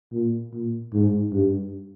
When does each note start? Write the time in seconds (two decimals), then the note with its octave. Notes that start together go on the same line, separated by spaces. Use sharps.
0.12 A#2
0.53 A#2
0.93 G#2
1.32 G2